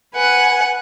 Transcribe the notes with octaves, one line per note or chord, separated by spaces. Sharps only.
B4 F#5 G#5